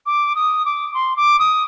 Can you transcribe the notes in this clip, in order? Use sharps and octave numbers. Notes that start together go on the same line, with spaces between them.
D6
D#6
D6
C6
D6
D#6